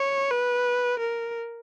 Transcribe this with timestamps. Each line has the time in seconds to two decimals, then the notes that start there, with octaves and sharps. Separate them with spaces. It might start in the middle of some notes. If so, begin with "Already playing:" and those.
Already playing: C#5
0.31 B4
0.99 A#4